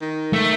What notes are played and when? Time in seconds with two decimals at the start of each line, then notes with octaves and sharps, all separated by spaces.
0.02 D#3
0.33 A3